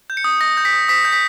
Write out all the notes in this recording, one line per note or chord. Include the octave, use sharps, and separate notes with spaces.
G6
C#7
D#6
D#6 A#6
G6
B6
D#6
D#6 B6
G6
B6